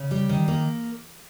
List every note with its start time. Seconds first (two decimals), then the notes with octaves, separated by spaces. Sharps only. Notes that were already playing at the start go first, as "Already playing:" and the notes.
Already playing: C#3
0.11 G3
0.29 D#3
0.48 A#3